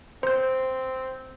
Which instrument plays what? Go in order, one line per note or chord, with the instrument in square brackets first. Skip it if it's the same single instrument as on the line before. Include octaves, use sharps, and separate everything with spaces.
[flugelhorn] C4 [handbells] C5 G6